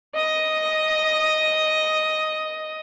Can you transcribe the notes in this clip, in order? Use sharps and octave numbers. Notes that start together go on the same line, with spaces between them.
D#5 D#6